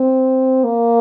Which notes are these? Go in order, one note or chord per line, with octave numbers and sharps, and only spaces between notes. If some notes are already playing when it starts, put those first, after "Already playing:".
Already playing: C4
A#3